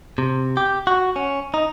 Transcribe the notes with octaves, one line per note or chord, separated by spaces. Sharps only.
C3
G4
F#4
C#4
D#4